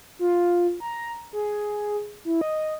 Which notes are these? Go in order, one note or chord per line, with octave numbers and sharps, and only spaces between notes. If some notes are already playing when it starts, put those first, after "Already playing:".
F4
A#5
G#4
E4
D#5